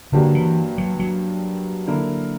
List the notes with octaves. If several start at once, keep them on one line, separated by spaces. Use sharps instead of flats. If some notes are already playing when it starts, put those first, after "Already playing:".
G2 D3 F#3 A#3 D4 G4
E3
F#3
F#3
D3 A#3 E4 A#4